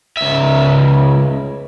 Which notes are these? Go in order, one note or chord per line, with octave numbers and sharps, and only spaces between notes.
C#2 E5